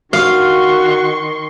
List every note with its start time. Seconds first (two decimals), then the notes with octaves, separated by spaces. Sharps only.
0.13 D#3 F#4 F5 C6 C#6